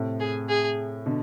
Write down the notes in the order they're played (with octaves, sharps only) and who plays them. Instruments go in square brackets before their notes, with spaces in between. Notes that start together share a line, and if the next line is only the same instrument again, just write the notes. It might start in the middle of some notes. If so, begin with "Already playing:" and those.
Already playing: [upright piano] A2 C3
[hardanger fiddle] G#4
G#4
[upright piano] B2 D3